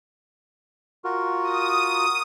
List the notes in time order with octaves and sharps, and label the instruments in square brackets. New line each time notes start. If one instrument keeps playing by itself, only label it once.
[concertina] F4 F#4 A#4
[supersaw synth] D#6